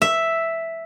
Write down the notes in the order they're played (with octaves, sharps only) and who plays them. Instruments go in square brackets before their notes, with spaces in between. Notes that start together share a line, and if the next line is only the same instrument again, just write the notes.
[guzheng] E5